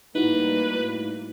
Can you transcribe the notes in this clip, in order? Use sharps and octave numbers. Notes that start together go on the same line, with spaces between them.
A2 G3 A#3 D#4 E4 F#4 B4